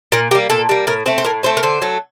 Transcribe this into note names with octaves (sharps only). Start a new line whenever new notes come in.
A#2 A#4
G3 A#3 G4
A#2 A4
G3 A#3
A2 A#4
A3 C4 C5
C5
A2 A#4
A3 C4 C5
A#4
D3 C5
F#3 A3